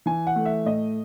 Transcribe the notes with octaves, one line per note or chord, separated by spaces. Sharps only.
E3 G#5
F#5
A3
E5
A2 D#5